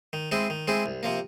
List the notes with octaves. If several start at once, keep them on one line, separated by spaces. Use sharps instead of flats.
D#3
G#3 C4 E4 G#4
D#3
G#3 C4 E4 G#4
C2
C3 F3 A#3